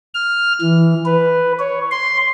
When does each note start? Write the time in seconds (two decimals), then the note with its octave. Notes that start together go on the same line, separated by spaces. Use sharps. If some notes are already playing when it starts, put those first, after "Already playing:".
0.15 F6
0.61 E3
1.06 B4
1.59 C#5
1.91 C6